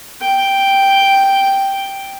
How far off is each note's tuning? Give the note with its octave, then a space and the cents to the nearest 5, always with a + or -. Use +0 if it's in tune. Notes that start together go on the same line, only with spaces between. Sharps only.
G5 +0